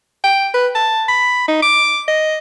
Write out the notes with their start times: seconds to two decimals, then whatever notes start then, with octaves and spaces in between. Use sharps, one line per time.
0.24 G5
0.54 B4
0.75 A5
1.08 B5
1.48 D#4
1.63 D6
2.08 D#5